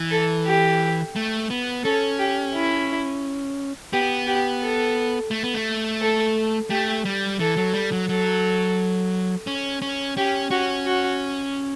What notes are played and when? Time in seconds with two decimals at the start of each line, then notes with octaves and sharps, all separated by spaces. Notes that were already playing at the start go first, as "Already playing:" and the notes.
Already playing: E3
0.11 A4
0.46 G4
1.16 A3
1.50 B3
1.84 C#4 A4
2.19 G4
2.54 E4
3.93 B3 G4
4.27 G4
4.61 A4
5.31 A3
5.43 B3
5.54 A3
6.01 A4
6.70 A3 G4
7.05 G3
7.39 E3 A4
7.57 F#3
7.73 G3
7.92 F#3
8.09 F#3 A4
9.47 C#4
9.82 C#4
10.17 C#4 G4
10.51 C#4 F#4
10.86 F#4